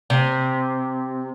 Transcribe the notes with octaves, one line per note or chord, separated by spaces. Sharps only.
C3